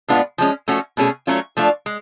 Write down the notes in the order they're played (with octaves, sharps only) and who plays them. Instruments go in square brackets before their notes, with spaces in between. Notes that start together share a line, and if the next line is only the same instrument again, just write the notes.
[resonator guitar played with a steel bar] A2 G#3 B3 D4 F4
F3 G#3 C#4
F3 A3 C#4 F#4
B2 A3 C#4 G#4
F#3 A3 C#4 F4
F3 A3 D4 F4
G#3